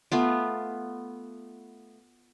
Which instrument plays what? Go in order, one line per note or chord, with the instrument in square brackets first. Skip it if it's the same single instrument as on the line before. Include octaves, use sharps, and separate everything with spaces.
[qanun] A3 B3 F4